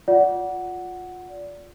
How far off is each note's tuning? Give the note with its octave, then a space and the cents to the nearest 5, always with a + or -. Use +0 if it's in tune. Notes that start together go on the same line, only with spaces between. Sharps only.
F4 +20 D5 -20 F#5 +0